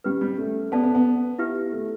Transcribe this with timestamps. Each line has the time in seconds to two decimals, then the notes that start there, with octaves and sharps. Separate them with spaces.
0.04 G3 C#4 G4 B4
0.21 G3
0.38 A3
0.72 B3 A4 D5 A5
0.83 B3
0.95 B3
1.39 E4 G4 B4 E5
1.73 A3